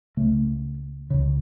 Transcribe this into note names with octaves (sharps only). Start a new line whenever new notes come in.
C#2 C#3 A3
C#2 C#3